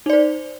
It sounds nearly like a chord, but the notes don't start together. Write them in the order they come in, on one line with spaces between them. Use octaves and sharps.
D#4 D5 C5